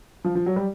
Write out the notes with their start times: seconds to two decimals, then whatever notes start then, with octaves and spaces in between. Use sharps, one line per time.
0.25 F3
0.35 F3
0.46 F#3
0.56 G3